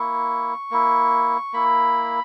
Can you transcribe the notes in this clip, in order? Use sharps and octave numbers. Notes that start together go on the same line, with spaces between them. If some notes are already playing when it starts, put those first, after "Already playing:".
Already playing: A#3 E4 C#6
A#3 E4
A#3 E4 B5